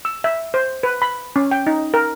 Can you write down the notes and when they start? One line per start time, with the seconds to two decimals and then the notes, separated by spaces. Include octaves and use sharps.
0.05 E6
0.24 E5
0.54 C5
0.83 B4
1.02 B5
1.36 C#4
1.51 G5
1.67 D#4
1.94 A#4